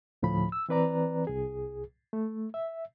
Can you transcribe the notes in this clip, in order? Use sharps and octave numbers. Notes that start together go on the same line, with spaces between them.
D2 A2 F3 B5
E6
E3 C4 B4 D5 A#5
C2 G#4
A3
E5